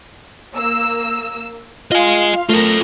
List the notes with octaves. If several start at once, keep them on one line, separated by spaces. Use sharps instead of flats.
A#3 E6
F4 D#5 F5 G#5 C6
A3 F4 A4 A#4 A#6